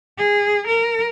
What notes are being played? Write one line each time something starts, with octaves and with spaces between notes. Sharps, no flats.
G#4
A#4